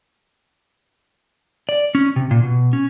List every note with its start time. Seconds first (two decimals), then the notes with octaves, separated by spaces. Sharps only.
1.69 D5
1.95 C#4
2.16 C3
2.31 A#2
2.43 B2
2.73 C#4